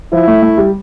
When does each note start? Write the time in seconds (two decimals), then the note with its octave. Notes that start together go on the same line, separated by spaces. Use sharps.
0.13 F3 E4
0.28 A3
0.42 A3
0.58 G3